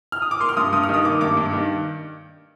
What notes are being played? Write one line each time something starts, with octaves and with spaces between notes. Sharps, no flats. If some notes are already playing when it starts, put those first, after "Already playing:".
F6
D#6
D6
A#3 C6
F6
G2 D#6
G2 D#6
F6
D#3 D#6
A#3 D6
G2 D6
G2
D#3